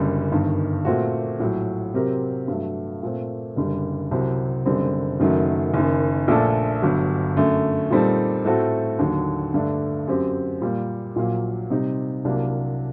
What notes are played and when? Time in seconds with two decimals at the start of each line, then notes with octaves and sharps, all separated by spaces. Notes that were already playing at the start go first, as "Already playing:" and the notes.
Already playing: F#1 F#2 D3 G3
0.31 G1 G2 D#3
0.85 A#2 A3 C4 F#4
1.40 A#1 A2 F#3
1.94 C3 F#3 C4 G4 A#4
2.48 G2 F#3 A3
3.03 A#2 A3 C4
3.56 F#1 F#2 D3 G3
4.11 C2 C3 F#3 C4
4.66 F#1 F#2 D3 G3 C4
5.19 F#1 F#2 D#3 F#3 A3
5.74 F#1 F#2 D#3
6.28 A#1 A#2 A3 D4 A4
6.82 G1 G2 F#3
7.36 F#2 D3 A3
7.90 A#2 G3 C4 D#4 A4
8.45 A2 A3 C4 F#4 A4
8.99 D#2 D3 F#3
9.54 G2 D3 A3 D4
10.07 F#2 F#3 C4 G4
10.61 A#2 G3 A#3
11.16 A#1 A#2 F#3 A#3
11.70 C3 G3 C4 D#4
12.24 C2 C3 F#3 A#3 D4